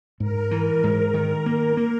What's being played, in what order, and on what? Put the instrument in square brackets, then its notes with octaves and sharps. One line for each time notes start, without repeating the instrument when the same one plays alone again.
[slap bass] G#2 [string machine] A#4
[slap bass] E3
G#2
D#3
A#3
A#3